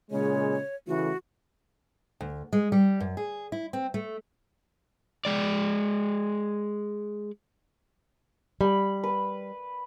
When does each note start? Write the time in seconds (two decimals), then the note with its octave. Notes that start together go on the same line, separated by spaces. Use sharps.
0.11 A#2 C#3 G#3 C#5
0.87 C#3 E3 A3 F#4
2.21 D2
2.53 G#3
2.72 G3
3.00 F#2
3.17 G#4
3.52 E4
3.73 C4
3.94 A3
5.25 G#3 D5
8.61 G3 B5
9.04 B4